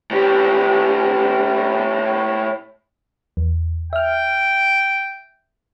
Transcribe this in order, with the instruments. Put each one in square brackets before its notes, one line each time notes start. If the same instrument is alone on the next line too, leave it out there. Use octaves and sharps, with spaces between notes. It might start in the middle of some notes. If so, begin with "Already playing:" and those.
[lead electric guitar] A2 G4
[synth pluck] E2
[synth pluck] E5 F6 [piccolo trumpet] G5